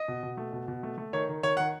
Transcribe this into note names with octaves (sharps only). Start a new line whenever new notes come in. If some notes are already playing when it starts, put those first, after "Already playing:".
Already playing: D#5
B2
B2
A3
B2
B2
A3
A3
D#3 C#5
D#3
D#3 C#5
D#3 F#5